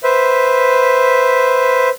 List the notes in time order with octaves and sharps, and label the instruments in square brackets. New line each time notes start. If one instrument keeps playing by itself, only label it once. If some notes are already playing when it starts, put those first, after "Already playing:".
[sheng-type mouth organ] B4 C5 E5